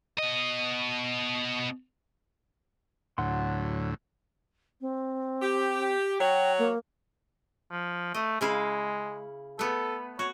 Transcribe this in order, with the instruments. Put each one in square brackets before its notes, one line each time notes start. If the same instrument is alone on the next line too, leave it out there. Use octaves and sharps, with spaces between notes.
[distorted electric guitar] B2 D#5
[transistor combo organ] D2 A2 [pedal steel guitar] F#3 F#5 C6
[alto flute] C4
[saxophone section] G4
[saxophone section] F#3 F#4 C#5 [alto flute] G5
[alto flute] A#3
[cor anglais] F3
[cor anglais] A3 [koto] D#5
[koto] C#3 E4 F5 [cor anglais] G#3
[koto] A3 B3 [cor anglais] A4
[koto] F#4 [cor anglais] C#5